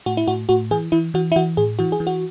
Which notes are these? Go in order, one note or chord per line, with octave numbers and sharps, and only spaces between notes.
A2 F#4
E4
A2 F#4
A2 F#4
E3 G#4
E3 E4
E3 F#4
E4
E3 F#4
A2 G#4
E3 F#4
G#4
E3
F#4